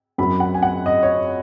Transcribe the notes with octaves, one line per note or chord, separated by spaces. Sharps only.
F#2 F#3 B5
F#5
G#5
F#5
D#5
C#5